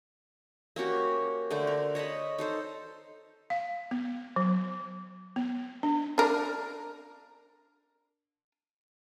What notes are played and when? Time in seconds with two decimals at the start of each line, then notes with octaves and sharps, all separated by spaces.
0.76 A#3 C#4 F#4 G4
1.50 D3 A3 C5 D6
1.67 A#4
1.95 C#5 D#5 A5 B5
2.38 D#4 A4 C5
3.50 F5
3.91 B3
4.36 F#3
5.36 B3
5.83 D4
6.18 D4 A#4